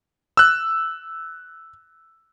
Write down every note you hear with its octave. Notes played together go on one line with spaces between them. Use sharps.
E6 F#6